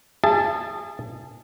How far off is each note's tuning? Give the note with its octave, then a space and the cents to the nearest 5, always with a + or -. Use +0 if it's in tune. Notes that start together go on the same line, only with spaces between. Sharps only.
G#4 -20 E5 +45 A5 +0